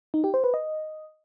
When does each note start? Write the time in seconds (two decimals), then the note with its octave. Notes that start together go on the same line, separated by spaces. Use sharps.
0.14 D#4
0.24 G4
0.34 C5
0.44 B4
0.54 D#5